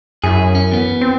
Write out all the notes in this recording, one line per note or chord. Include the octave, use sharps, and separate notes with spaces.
F#2 E4 G#4
C#4
E2 B3
C4